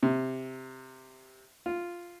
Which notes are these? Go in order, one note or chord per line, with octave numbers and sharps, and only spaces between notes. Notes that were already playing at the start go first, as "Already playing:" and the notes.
C3
F4